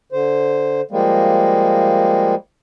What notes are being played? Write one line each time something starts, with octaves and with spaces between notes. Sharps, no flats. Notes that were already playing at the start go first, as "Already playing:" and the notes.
D3 C5
F3 G3 G#3 A#3